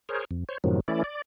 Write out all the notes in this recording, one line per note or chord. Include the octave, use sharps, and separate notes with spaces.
G#4 A#4 C5 C#5
F2
C5 C#5
F#2 A2 C3 D#3 F3 F#3
E3 A3 C#4 E4 D5
D5